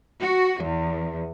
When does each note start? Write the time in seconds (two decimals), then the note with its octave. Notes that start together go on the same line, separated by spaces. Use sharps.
0.21 F#4
0.62 E2